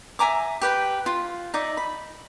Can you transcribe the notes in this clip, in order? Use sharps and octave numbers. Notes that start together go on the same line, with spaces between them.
E5 G#5 A#5 D6
G4 B4 G5
F4
D#4 D5 E5
B5